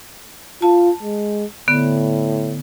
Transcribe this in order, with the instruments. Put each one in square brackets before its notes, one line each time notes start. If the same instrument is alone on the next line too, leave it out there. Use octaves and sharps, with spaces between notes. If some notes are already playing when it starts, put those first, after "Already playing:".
[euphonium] F4 [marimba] A5
[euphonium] G#3
[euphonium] A2 [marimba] D3 B3